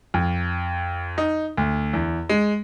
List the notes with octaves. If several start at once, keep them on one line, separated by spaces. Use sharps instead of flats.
F2
D#4
D2
E2
G#3